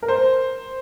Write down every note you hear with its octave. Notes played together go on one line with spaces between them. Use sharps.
A#4
C5